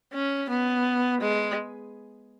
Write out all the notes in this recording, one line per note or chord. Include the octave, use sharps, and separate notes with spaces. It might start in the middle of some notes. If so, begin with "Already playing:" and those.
C#4
B3
G#3